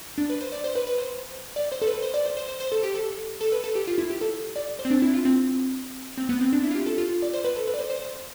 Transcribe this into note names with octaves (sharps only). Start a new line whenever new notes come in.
D4
B4
C5
D5
C5
B4
B4
C5
D5
C5
A4
B4
C5
D5
C5
C5
C5
C5
A4
G4
A4
A4
B4
A4
G4
F4
E4
G4
A4
D5
C5
C4
D4
E4
F4
C4
C4
B3
C4
D4
E4
F4
G4
A4
F4
D5
C5
B4
A4
B4
D5
C5
C5
C5